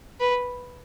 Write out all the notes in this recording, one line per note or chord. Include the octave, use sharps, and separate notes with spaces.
B4